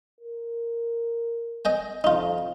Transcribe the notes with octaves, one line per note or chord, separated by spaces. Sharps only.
A#4
D#5 G5 G#5
F2 D#4 F4